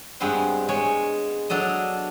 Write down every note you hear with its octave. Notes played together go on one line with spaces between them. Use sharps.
G2 G#3 B3 C4 C6
G#3 C#5
F#3 D4 A4 D#5